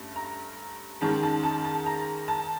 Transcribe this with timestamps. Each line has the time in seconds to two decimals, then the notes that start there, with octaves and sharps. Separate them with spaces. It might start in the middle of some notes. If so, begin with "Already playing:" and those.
Already playing: G2 A3 C#4
0.16 A#5
1.01 G#2 D#3 G#3 C#4 A5
1.23 A5
1.44 A5
1.65 A5
1.86 A#5
2.28 A5